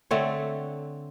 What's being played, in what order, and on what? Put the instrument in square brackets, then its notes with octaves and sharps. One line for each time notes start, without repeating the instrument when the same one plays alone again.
[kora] D3 A3 C4 C#5